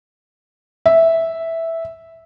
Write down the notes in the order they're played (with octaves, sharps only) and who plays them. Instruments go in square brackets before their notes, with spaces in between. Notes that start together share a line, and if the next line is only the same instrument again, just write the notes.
[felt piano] E5